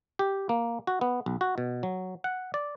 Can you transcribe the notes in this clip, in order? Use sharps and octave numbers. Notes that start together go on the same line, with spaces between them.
G4
A#3
F#4
B3
B1
F#4
B2
F#3
F#5
D5